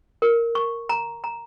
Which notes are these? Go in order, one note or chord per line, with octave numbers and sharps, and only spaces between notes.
A#4
C#6
A#5
A#5